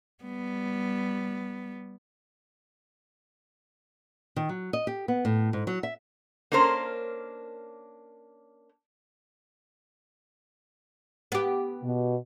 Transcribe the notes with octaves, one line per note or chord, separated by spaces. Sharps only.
G3 B3
D#3
F#3
D#5
G4
B3
A2
G#2
F#3
E5
A#3 C#4 D4 A#4 C5
B3 G4
B2